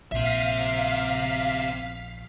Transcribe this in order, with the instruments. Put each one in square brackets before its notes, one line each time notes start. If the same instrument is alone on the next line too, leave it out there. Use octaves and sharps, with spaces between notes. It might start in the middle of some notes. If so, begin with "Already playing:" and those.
[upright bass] A#1 [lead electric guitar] C4 E5 [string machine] F5 B6 C7